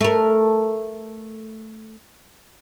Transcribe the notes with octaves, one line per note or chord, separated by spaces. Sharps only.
A3 A#4